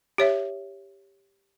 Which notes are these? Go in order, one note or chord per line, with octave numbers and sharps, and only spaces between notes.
G4 C#5 E5